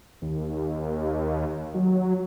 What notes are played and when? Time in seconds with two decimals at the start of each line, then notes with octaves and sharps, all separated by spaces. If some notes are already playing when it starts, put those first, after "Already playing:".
0.22 D#2
1.74 F#3